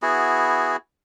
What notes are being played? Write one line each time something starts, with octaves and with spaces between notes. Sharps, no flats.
B3 E4 F#4 G#4